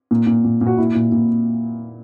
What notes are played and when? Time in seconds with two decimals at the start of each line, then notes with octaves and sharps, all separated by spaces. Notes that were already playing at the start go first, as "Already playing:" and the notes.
0.11 A#2
0.27 A#2
0.44 A#2
0.61 A#2
0.67 F#4
0.78 A#2 E4
0.95 A#2
1.12 A#2